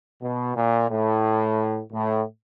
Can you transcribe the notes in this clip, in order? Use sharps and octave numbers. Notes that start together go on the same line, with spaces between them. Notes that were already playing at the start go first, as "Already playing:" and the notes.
B2
A#2
A2
A2